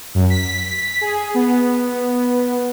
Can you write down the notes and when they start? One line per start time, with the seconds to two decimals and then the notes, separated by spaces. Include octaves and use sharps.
0.14 F#2
0.30 B6
1.01 G#4
1.34 B3